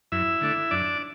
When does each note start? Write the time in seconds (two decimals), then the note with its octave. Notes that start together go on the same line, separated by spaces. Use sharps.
0.12 F#2 E4 E5
0.41 D3 A3 D4
0.71 F#2 D4 D5